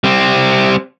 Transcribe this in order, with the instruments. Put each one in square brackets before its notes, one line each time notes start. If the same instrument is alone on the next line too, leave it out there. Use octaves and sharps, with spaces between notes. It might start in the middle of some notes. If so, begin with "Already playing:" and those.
[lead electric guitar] G3 C4